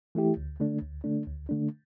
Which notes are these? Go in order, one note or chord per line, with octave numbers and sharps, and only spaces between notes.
E3 A3 E4 G4
D2
D3 A3 D4
D2
D3 A3 D4
D2
D3 A3 D4